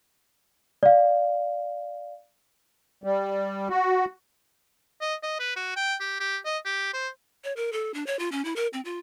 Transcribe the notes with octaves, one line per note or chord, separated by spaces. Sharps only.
D5 F5
G3
F#4
D#5
D#5
B4
F#4
G5
G4
G4
D#5
G4
C5
C#5
A#4
A4
D4
C#5
F4
C#4
E4
A#4
C4
F4